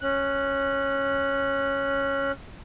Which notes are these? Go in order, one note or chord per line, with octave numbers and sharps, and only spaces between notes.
C#4 F#6